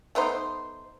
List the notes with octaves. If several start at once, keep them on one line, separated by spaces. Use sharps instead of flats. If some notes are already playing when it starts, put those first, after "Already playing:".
A3 B3 D#4 C5